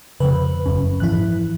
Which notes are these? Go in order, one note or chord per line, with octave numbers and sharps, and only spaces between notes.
F2 C#3 B4
F#1 F#2 C#4
G#2 E3 F3 E4 F#6